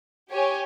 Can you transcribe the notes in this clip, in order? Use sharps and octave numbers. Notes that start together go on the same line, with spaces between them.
G4 C#5 G#5